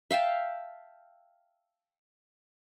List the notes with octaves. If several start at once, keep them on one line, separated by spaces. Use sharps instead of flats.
E5 F5 G5 A5